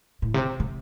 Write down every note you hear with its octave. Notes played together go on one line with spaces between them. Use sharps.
A2
C3
C3